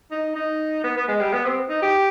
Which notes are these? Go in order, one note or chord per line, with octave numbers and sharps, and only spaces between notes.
D#4
D#4
B3
B3
G#3
G3
B3
C4
D#4
G4